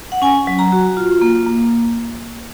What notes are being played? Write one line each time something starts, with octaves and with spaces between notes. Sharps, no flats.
F#5
C#4 G#5
F#3
A#5
F#4
F4
A#3
A#3